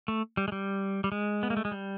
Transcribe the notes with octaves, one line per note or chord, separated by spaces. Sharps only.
A3
G3
G#3
G3
G3
G#3
B3
A#3
A3
G#3
G3